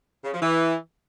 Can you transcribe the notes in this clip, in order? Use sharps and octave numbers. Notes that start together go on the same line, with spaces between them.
C#3
F3
E3